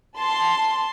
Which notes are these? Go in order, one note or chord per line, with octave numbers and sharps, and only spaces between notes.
A5 C6